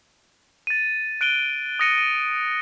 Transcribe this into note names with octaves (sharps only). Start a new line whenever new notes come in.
A6 D#7
F#6 D7 D#7 G7
D#6 F#6 A#6 C#7 D#7
D#7